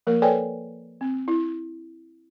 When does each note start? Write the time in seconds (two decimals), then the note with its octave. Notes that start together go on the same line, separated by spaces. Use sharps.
0.07 F3 A#3 A#4
0.22 A4 B4 C#5 D5 G5 G#5
1.01 C4
1.28 E4